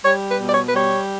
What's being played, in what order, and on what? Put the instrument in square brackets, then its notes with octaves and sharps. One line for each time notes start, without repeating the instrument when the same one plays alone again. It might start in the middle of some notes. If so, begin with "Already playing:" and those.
[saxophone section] G3 C#5
B4
B2
D5
C#5
B4
G3 C#5